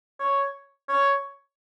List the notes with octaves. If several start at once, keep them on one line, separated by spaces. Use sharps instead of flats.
C#5
C#5